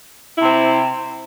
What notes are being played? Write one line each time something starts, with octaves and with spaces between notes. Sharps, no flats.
C3 C4 E4